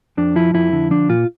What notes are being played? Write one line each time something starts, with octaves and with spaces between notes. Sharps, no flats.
F2 D4
F3 E4
F2 E4
D3
F3 D4
A#2 F4